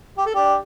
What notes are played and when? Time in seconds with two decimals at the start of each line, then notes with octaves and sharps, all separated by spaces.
0.17 G4
0.26 A4
0.34 D4 G4